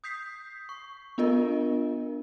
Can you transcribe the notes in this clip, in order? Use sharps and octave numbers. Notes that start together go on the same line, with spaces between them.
D#6 G6 B6 C7
C#6
B3 D4 F4 A#4 D#5